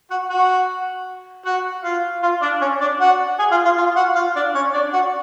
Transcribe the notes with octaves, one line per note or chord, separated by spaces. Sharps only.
F#4 F#5
F#4 F#5
F#4 F#5
F4 F5
F4 F5
D4 D5
C#4 C#5
D4 D5
F#4 F#5
G#4 G#5
F4 F5
F4 F5
F4 F5
F#4 F#5
F4 F5
D4 D5
C#4 C#5
D4 D5
F#4 F#5